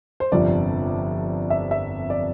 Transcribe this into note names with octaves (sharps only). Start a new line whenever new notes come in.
C5
G1 F2 C3 F3 D5
E5
E5
D5